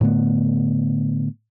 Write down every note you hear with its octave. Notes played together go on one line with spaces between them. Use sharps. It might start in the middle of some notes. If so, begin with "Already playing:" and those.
A2 D3 A3 B3